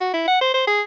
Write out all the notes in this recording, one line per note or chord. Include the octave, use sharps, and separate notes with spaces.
F#4
E4
F#5
C5
C5
G#4